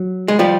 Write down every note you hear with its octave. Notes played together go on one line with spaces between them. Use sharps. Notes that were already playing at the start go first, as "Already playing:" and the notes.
Already playing: F#3
G#3
F3 G3